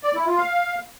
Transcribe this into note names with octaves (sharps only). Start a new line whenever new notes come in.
D5
E4
F4
F5